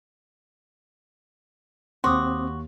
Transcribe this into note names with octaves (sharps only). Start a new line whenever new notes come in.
D#2 C4 F#4 C6 D6 D#6